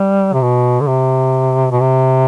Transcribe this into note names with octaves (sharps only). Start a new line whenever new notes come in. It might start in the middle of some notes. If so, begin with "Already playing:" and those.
Already playing: G3
C3
B2
D3
C3
B2
C3